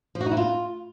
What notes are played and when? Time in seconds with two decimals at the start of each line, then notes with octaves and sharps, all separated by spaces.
0.15 F3
0.21 F#4
0.26 D#4
0.31 E4
0.37 F4